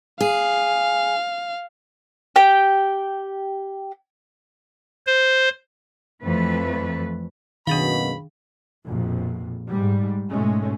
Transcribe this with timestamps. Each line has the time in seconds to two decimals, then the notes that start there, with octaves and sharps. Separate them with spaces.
0.21 G#4 F5
2.36 G4 G5
5.07 C5
6.24 F2 E3 A3 B4
7.67 F#1 F#2 B2 D#3 D4 G#4 F5 B5
8.86 A#1 F2 B2
9.66 G#2 G3
10.29 G#2 B2 G#3 A3 C#4